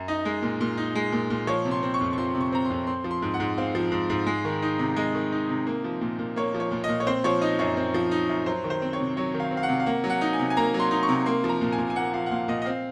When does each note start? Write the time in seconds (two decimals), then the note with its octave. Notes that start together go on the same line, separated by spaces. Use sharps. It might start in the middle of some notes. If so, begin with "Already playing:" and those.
Already playing: F#2
0.08 D#4 D#5
0.25 G#3
0.42 A#2
0.61 A#2
0.77 D#4
0.95 G#3
1.12 A#2
1.30 A#2
1.47 F3 C#5
1.65 C3
1.71 C6
1.83 C4
1.94 C#6
2.01 F2
2.13 C#6
2.18 F3 C6
2.35 C3
2.41 C#6
2.52 C4 A#5
2.65 C6
2.70 F2
2.87 C4 C6
3.04 F3
3.11 C6
3.22 G#2
3.34 F#5
3.40 G#2
3.58 C4 F5
3.75 F3
3.92 G#2
4.10 G#2
4.27 G#3
4.45 D#3
4.62 D#4
4.79 C3
4.96 G#3 D#5
5.15 D#3
5.32 D#4
5.49 C3
5.67 A#3
5.84 F3
6.01 A#2
6.19 A#2
6.36 A#3 C#5
6.54 F3
6.60 C#5
6.72 A#2
6.84 D#5
6.89 A#2
7.00 C#5
7.07 C4 C5
7.24 F3 C#5
7.41 D#4 D#5
7.59 F#2 C#5
7.77 C4
7.94 F3
8.11 D#4
8.29 F#2
8.46 F#3 C5
8.64 D#3
8.70 C5
8.82 C4
8.93 C#5
9.00 C3
9.17 F#3 C#5
9.34 D#3
9.40 F5
9.51 C4
9.57 F5
9.63 F#5
9.68 C3
9.80 F5
9.86 A#3 F#5
10.04 F#3
10.10 F#5
10.21 D#4
10.33 G#5
10.39 C3
10.50 G#5
10.57 A#3 A#5
10.74 F#3
10.80 C6
10.91 D#4
11.03 C#6
11.09 C3
11.26 A#3 C6
11.44 F3
11.49 A#5
11.61 A#2
11.72 G#5
11.78 A#2
11.90 G#5
11.96 A#3 F#5
12.14 F3 F5
12.26 F#5
12.31 A#2 F5
12.48 A#2 D#5
12.62 D#5
12.66 C4 F5